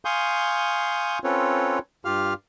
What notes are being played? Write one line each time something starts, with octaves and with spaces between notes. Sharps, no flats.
F5 G#5 C6 C#6 D#6 G6
C4 C#4 F4 A4 B4 C#5
G2 F4 G4 F5 F6